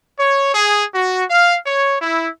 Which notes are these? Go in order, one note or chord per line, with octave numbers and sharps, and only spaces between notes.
C#5
G#4
F#4
F5
C#5
E4